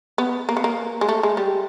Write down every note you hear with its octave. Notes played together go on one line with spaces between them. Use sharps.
B3
A#3
B3
A#3
G#3
A3
G#3
G3